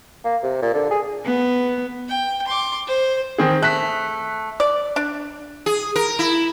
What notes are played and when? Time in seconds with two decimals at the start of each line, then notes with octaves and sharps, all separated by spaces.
0.24 A#3
0.43 C3
0.62 A#2
0.74 D3
0.91 G#4
1.25 B3
2.08 G5
2.47 C6 D6
2.88 C5
3.38 D#3 C4 G#4
3.62 A3 F#6 B6
4.60 D5
4.96 D4
5.66 G#4
5.96 A#4
6.19 E4